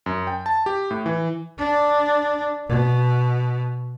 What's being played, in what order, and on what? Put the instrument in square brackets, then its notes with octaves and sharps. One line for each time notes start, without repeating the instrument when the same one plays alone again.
[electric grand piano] F#2
G5
A5
G4
A2
E3
[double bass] D4
B2